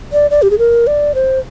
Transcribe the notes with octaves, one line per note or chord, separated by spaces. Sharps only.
D5
D5
G4
G#4
A#4
D5
C5